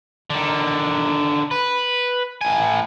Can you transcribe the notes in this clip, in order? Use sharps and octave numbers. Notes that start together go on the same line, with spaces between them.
D3 D#3
B4
A2 G#5